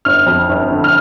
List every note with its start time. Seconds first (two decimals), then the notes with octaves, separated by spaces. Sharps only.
0.05 G1 F6
0.27 F2
0.49 G1
0.70 D3
0.84 F6